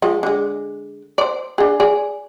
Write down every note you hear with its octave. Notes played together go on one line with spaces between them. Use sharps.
F3 G#3
D3 G#3
C5 D5
D4 G#4
G#4 D5